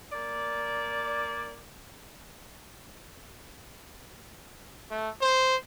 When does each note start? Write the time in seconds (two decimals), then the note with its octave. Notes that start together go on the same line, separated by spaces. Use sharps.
0.12 A#3 D5
4.91 A3
5.21 C5